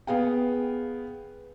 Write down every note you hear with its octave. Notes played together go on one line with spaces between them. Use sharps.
B3 G#4 F5 G5